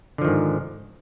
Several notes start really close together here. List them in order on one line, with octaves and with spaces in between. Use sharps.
D3 F3 D#3 G#2